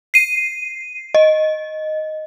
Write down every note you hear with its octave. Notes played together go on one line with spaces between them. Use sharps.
C7 D#7
D#5